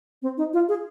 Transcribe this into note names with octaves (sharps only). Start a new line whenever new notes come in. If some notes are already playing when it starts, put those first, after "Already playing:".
C4
D#4
F4
G#4